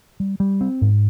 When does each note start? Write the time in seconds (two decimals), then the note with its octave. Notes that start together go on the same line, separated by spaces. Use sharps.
0.20 G3
0.40 G3
0.61 C4
0.81 G#2